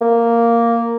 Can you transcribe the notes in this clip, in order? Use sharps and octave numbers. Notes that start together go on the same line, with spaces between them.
A#3